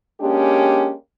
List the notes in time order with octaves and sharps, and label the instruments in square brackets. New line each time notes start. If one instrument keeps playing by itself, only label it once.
[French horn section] G#3 A#3 C#4 D4 G4